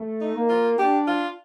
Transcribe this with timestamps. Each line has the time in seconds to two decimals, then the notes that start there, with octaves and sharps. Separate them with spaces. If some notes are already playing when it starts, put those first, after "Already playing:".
Already playing: A3
0.21 D#4
0.35 A#3
0.49 F4
0.79 D4 G4
1.07 F4